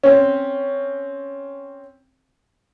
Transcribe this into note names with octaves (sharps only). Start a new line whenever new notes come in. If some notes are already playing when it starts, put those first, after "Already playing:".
C4 C#4